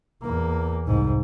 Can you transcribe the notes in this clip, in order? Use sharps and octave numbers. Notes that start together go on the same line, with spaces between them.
E2 A#3
C2 G#2